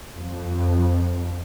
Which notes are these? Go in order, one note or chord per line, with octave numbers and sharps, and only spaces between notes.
F2